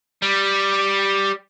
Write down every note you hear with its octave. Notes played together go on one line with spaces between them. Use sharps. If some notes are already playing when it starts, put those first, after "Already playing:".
G3